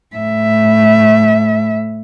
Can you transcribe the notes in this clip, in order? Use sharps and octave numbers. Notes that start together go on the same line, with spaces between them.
A2 E5